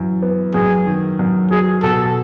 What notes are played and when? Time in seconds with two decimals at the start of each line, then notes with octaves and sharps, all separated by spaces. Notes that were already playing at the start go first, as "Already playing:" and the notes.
Already playing: F#2 E3
0.22 B3
0.54 F#2 G#4
0.87 D#3
1.19 F#2
1.51 F#3 G#4
1.83 B2 A4